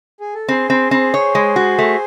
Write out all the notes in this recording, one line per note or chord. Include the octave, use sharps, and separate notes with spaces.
G#4
A4
C4 G#4 C5
C4
C4
C#5
G#3
F#4
A3